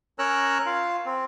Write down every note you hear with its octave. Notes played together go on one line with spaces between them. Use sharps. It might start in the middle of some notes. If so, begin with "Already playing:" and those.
C#4 A#4 C#5 A#5 E6 F#6
F4 F5
C4